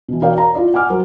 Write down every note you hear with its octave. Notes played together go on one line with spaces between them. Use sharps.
B2 E3
F#4 A#4 C#5 D5 F5 G5
A#5
E4 F4 D5
F#5 G#5 D6 F6
F#3 A#4 C5